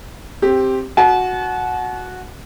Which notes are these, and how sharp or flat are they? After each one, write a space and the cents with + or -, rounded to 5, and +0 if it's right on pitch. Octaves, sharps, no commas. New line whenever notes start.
C4 +10 G4 +0
F#4 -10 A5 -40